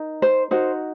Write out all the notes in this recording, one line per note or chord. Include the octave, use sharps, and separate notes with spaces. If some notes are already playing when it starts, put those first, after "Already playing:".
Already playing: D#4 A#4
C5
D#4 F#4 A#4 C5